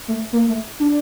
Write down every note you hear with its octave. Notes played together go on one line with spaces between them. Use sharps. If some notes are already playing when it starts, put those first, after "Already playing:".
A3
A#3
A3
D4